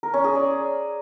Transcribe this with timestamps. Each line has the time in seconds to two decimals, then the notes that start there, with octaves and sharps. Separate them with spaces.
0.03 A#4
0.14 C#4
0.24 G#4
0.35 D5